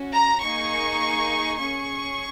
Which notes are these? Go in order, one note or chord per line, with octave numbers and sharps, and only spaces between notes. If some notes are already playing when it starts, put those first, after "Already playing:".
Already playing: C#4 F#4
A#5
A#3 D#4 G#4 C#6
C#4 G#4 C#6